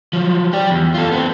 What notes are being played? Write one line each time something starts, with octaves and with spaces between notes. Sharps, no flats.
F3 F#3
G4 D5
E2
F4 A4
B3 C4